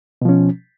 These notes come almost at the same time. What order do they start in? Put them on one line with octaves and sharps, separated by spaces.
B2 F3 C#4